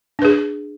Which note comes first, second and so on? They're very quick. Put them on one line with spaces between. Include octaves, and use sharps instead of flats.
D4 B4 G#4